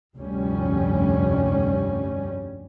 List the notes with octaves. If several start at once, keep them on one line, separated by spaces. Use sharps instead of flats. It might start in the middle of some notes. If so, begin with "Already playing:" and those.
F1 D2 G2 G3 C#4